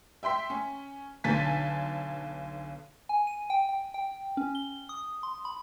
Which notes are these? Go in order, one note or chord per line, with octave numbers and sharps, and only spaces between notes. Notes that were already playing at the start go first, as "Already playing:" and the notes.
E5 G5 C6 B6
C#4
B1 D3 G#5 A6 B6
G#5
D#7
G5
G5
G5
C#4
G7
D#6
C6
B5